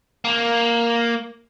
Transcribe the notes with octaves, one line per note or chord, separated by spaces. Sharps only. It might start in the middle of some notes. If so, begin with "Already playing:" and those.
A#3